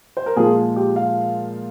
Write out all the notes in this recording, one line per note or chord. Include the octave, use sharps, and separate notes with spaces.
C5
A#4
A#2 F3 G#3 G#4
G4
F5